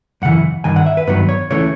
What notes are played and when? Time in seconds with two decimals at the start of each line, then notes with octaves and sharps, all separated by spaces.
0.22 F#2 C#3 E3 F#5
0.64 G2 D#3 G#5
0.76 F#5
0.86 E5
0.97 B4
1.07 G2 D#3 F#3 B3 B4
1.29 C#5
1.50 C#2 C#3 E3 A3 C#5